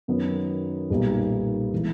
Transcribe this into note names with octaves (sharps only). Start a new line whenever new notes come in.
F#2 D#3 F#3 B3
B1 A#2 G3 B3 D#4
E3 G#3